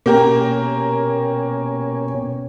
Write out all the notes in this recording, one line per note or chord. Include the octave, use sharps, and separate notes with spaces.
B2 A#3 C#4 G4 A#4